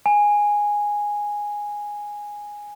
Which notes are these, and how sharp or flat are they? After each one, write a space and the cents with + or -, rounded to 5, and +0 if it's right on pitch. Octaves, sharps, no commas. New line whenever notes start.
G#5 -5